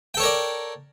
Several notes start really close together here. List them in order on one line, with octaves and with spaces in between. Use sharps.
G5 A4 C#5 A#4 D5